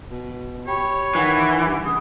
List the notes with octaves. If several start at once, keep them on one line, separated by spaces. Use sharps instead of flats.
B2
G4 C#5 B5
D#3 E3 F#5
G2
C#3 D#6